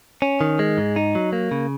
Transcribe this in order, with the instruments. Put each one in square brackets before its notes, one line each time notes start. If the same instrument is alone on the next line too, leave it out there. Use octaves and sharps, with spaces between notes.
[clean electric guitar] C#4
D#3
G#3
G#2
D#4
F#3
A#3
C#3